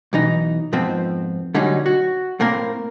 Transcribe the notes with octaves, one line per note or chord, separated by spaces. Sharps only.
B1 E3 D#4
F2 G#2 F3 B3 C4
D3 F#3 G3 C#4 D#4
F#4
A2 A#3 C4 A#4